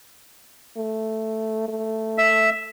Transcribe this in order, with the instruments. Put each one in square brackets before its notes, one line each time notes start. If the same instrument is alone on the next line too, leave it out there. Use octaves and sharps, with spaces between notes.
[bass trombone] A3
A3
[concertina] E5